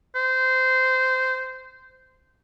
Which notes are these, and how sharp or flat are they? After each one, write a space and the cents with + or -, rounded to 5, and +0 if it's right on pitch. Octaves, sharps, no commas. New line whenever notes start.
C5 -15